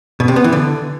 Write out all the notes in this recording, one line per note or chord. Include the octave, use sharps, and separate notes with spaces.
B2
C3
B3
E3
D3